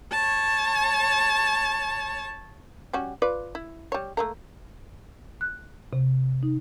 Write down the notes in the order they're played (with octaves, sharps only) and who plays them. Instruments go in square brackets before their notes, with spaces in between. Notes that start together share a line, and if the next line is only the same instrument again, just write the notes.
[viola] C#5 A5
[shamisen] G3 C#4 F#4
F4 B4 D5
E4
G3 C#5
A3 A#3 A#4
[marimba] F#6
C3
D#4